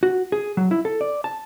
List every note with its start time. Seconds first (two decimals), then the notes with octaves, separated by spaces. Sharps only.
0.03 F#4
0.32 G#4
0.57 F#3
0.71 E4
0.85 A4
1.01 D5
1.24 A5